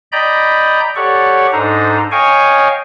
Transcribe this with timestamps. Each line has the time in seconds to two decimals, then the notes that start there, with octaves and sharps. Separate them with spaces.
0.12 D5 D#5 G5 A#5 B5 G6
0.96 G4 A4 C#5 D5 F#5 C#6
1.52 G#2 D4 D#4 A4 C5 A#5
2.11 C#5 D#5 F5 G5 G#5 C#6